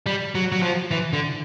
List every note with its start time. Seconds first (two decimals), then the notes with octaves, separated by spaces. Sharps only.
0.06 G3
0.35 F#3
0.52 F#3
0.62 F3
0.91 E3
1.13 D3